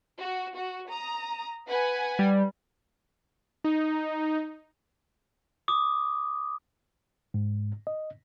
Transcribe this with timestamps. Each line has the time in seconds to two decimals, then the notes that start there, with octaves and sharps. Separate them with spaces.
0.18 F#4
0.55 F#4
0.89 A#5 D#6
1.68 B4 F#5 G#5
2.19 G3
3.64 D#4
5.68 D6 D#6
7.34 G#2
7.87 D#5